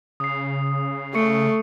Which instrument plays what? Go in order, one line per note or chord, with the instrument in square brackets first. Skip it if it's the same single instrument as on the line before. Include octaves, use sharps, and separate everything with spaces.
[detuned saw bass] C#3 [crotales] D#6 C7
[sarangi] A3 [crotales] C#6 C#7